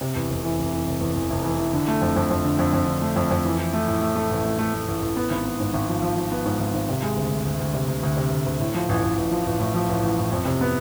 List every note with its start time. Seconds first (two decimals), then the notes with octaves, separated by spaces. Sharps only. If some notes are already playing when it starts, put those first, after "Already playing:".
0.01 C3
0.15 E2
0.30 F1
0.44 E3
0.59 F1
0.73 E3
0.87 F1
1.01 E2
1.16 E2
1.30 F1
1.44 E3
1.59 E3
1.73 D3
1.88 A3
2.02 F2
2.16 F2
2.30 F2
2.45 D3
2.59 F2
2.73 F2
2.87 D3
3.02 A3
3.16 F2
3.31 F2
3.45 E3
3.59 E3
3.73 A3
3.88 A2
4.01 A3
4.16 A3
4.31 A1
4.44 A3
4.59 A3
4.74 A3
4.88 A1
5.02 A1
5.17 B3
5.30 G#1
5.45 B3
5.60 G#2
5.73 G#1
5.88 F3
6.02 F3
6.17 F3
6.32 B3
6.45 G#2
6.59 G#1
6.74 G#1
6.89 C3
7.02 G#3
7.16 D2
7.31 D2
7.45 D2
7.60 D2
7.74 C3
7.88 D2
8.03 D2
8.17 C3
8.31 D2
8.46 D2
8.59 A2
8.74 F3
8.89 A1
9.03 A1
9.17 A1
9.31 F3
9.46 A1
9.60 A2
9.74 F3
9.89 A1
10.03 A1
10.18 A2
10.32 F2
10.45 C3
10.61 B3